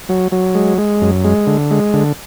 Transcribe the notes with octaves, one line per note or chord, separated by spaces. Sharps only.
F#3
F#3
G#3
G#3
F#2
G#3
D3
G#3
D3